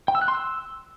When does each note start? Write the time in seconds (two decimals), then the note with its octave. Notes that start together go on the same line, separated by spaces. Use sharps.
0.08 G5
0.15 E6
0.21 F#6
0.28 C6
0.35 E6